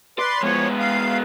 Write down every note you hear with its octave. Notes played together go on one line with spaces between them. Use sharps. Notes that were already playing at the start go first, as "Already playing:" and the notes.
B4 D5 C6
F3 G#3 B3 C#5
F5